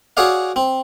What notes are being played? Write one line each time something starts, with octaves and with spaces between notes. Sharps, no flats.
F#4 G#4 C#5 D5 F5
C4